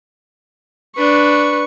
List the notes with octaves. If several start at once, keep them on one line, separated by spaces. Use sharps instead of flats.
D4 B4 C#6